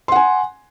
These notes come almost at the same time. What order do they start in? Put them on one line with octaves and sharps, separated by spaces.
C6 F#5 G#5